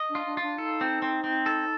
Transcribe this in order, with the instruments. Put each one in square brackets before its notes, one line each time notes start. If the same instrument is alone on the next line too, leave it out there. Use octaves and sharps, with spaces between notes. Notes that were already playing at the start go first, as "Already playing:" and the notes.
Already playing: [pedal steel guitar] D#5
[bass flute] D4
[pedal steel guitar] F4
[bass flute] D4
[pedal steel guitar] F4
[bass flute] D4
[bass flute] D#4 [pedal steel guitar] A4
[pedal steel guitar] C4
C4
C4
A4